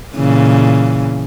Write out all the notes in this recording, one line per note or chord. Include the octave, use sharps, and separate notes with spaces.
A#2 C#3 E3